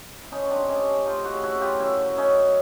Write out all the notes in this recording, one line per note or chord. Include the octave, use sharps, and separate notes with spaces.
E4
F3 C#4 D#4
C#4
C4 D4
C3
C#4 D#4
C3
A3 D#4 F4
E4 F#4
C#3
E4 F#4
C#3
F4 G4
F#2 E4 F#4
F#3
C#4 D#4
F#3